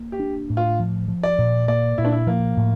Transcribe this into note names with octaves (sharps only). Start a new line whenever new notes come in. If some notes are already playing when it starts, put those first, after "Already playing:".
Already playing: A#3
G4
D4
A2
F4
F3
F3
D5
A#2
A#3 D5
A#2 E4
D4
E4
F3 A#3
A2